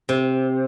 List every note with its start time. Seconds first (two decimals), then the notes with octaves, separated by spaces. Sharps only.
0.09 C3